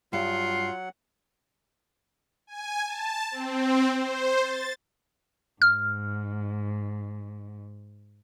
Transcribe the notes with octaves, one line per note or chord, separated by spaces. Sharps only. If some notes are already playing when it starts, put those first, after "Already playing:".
G2 F#3 F4 F#5 C7
G#5
A5
C4
C5
A6
G#2 F6